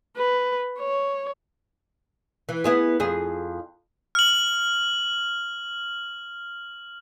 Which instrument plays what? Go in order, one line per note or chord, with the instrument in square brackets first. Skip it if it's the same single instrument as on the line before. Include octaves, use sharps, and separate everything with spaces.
[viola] B4
C#5
[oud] E3
B3 E4 G#4
F2 G#4
[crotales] F6 F#7